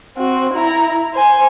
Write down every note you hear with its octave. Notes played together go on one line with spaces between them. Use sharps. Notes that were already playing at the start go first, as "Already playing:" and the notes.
C4 F#4
E4 A#5
C5 G#5